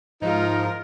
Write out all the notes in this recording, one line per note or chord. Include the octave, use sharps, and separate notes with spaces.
G#2 F3 D#4 F4 A#4